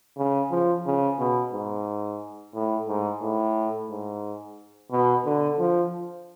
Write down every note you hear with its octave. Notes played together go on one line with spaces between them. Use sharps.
C#3
F3
C#3
B2
G#2
A2
G#2
A2
G#2
B2
D3
F3